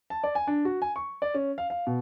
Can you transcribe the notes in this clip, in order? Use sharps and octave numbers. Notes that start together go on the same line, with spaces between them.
A5
D5
G#5
D4
F#4
G#5
C#6
D5
C#4
F5
F5
B2